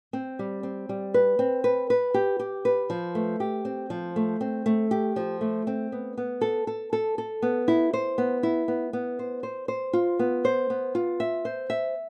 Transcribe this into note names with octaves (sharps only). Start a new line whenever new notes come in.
C4
G3
C4
G3
B4
C4
B4
B4
G4
G4
B4
F3
A3
G4
C4
F3
A3
C4
A3
G4
F3
A3
C4
B3
B3
A4
A4
A4
A4
B3
E4
C5
B3
E4
B3
B3
C5
C5
C5
F4
B3
C5
B3
F4
E5
C5
E5